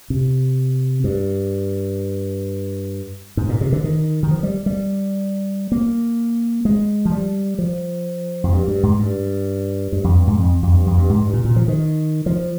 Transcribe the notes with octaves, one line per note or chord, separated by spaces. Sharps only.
C3
G2
G#2
A#2
C3
D3
D#3
D#3
F3
G3
G3
A#3
G#3
F3
G3
F3
F2
G2
G2
G#2
G2
G2
F2
G2
G#2
F2
F2
G2
F2
G2
G#2
G2
A#2
A#2
F3
D#3
F3